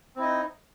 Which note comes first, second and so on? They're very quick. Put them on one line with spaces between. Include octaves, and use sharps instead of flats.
C4 E4 D#5 D#4